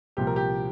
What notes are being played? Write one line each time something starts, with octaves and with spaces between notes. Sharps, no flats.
C2 A#2 F3 G4
A#4
G4